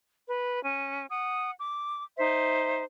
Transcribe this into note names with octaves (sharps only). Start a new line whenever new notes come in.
B4
C#4
F#5 D#6
D6
D#4 C5 E5